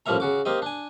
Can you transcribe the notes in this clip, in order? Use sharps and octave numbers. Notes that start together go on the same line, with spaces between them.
A1 F3 G3 A#3 E5 A#5
C#3 F#4 D6
A#3 C4 G4 D#5
D4 G#5